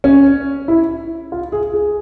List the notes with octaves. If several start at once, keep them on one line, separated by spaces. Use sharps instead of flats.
C#4
E4
F4
G#4
G#4